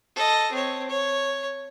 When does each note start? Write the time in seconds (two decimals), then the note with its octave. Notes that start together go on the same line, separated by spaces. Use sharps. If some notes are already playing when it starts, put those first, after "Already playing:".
0.16 A4 D#5
0.52 C4 C#5
0.89 C#5